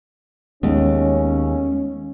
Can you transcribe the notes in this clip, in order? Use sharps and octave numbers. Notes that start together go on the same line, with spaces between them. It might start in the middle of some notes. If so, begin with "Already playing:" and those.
D#2 G#3 B3 C#4